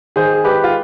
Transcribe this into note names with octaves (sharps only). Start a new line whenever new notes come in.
D#3 G#4 C5
G#4
G#3 G4 B4
F4